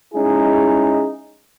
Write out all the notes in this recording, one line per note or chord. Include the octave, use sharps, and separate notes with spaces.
G#3 C#4 D#4 E4 G#4